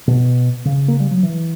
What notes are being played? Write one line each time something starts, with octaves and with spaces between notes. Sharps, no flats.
B2
C#3
A#3
G3
F#3
E3